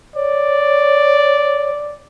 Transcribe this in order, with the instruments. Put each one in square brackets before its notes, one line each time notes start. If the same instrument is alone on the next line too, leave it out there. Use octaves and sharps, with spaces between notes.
[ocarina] C#5 [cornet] D5